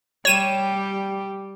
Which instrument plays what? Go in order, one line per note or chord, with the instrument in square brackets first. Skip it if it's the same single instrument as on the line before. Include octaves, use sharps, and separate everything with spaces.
[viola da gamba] G3 G4 [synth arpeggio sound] C#5 D#7 E7